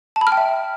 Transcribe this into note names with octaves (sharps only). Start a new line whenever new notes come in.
A5
B5
F6
G5
E5